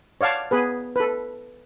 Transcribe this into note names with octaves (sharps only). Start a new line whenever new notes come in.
C#5 D5 F5 F#5 A5
B3 G#4 B4
A4 B4